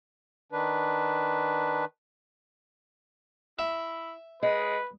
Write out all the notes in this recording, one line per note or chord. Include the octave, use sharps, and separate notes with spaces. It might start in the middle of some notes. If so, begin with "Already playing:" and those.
D#3 D4 B4
E4 E5
G#3 B4 D#5